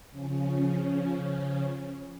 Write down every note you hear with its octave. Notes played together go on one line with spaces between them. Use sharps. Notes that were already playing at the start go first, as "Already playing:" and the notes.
C#3 F3 C#4